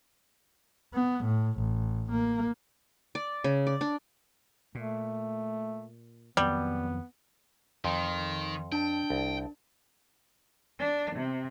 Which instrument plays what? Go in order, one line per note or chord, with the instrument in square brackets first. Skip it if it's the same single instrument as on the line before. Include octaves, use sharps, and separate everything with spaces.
[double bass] B3
A2
A1
A#3
[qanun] D5
C#3
D5
D4
[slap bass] A#2 [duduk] A3
[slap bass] F2 D#3 F#3 [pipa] G3 [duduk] B3
[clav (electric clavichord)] F2 [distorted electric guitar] D#3 [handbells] C6
[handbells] D4 A5 [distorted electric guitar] G5
[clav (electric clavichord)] C2
[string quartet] D4
C3